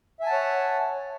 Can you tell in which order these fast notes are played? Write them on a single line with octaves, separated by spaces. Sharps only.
E5 G#5 A5 F#5 C#5